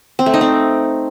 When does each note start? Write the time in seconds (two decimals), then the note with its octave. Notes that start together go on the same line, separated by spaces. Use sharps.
0.19 C4
0.26 A3
0.34 D#4
0.41 C4